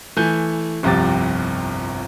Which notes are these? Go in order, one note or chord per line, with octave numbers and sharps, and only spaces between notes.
E3 A3 G#5 G6
G1 C2 F2 C3 G4 A6